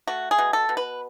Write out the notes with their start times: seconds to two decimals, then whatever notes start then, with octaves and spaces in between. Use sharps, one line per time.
0.07 A3 F#4
0.31 G#4
0.38 B2
0.53 A4
0.69 B2
0.77 B4